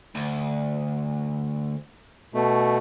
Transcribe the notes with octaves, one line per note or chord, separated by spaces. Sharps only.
D2
B2 A3